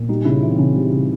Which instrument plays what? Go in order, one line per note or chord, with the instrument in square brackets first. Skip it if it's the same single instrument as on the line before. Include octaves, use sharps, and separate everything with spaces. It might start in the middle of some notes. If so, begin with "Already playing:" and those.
Already playing: [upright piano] A#2
[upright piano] G3 [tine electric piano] D#4
[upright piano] C#3 [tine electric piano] E4
[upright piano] E3 [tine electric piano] F4
[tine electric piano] C4
[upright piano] C#3 [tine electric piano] C#4
[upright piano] G3 [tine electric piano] C4
[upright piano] C#3